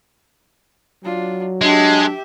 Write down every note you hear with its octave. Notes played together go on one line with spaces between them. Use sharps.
F#3 D4 F4
G#3 D4 G4 E5